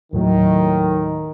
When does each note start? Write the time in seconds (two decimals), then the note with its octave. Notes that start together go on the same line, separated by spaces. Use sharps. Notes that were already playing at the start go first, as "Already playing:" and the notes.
0.13 D#2 A2 D#3 F#3